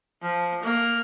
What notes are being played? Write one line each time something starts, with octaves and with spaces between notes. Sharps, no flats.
F3
A#3